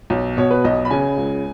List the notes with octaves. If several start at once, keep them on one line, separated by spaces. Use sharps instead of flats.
B1
B2 C#5
B4
B1 D#5
B5
C#3 G#5
C#2